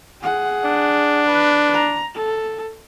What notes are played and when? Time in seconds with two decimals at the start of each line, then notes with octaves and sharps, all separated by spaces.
0.22 G#4 F#5
0.65 D4
1.27 B4
1.73 A#5
2.15 A4